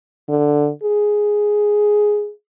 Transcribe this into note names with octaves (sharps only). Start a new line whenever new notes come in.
D3
G#4